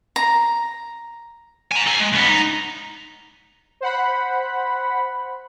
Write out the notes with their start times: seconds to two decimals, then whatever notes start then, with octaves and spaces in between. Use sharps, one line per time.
0.16 A#5
1.71 G#5 A#5
1.87 A4 G#5
2.00 G#3
2.12 C#2 B3
2.28 D#4
3.81 C5 F#5 B5